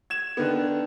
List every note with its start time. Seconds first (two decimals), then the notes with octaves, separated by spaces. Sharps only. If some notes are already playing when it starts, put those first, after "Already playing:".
0.10 G#6 E7
0.37 D3 D#3 B3